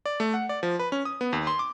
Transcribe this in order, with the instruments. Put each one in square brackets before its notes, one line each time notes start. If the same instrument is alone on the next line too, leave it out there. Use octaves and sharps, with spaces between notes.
[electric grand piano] D5
A3
F#5
D5
F3
B4
C#4
D#6
B3
D#2
C6
D6